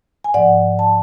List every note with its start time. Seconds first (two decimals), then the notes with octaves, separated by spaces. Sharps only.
0.24 G#5
0.34 G#2 F3 D5 F#5
0.79 A5